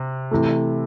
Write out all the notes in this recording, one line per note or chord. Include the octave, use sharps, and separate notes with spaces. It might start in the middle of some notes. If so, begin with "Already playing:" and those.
Already playing: C3
C3 E3 A3